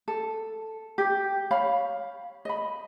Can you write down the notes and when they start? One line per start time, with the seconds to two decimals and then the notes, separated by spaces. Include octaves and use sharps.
0.08 A4
0.98 G4
1.51 C#5 F5 B5
2.45 D#5 B5